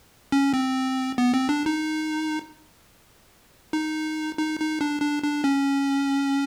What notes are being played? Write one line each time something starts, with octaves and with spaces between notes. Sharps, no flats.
C#4
C4
B3
C4
D4
D#4
D#4
D#4
D#4
D4
D4
D4
C#4